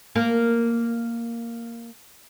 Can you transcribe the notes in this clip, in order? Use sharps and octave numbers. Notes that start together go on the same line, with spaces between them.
A#3 A#4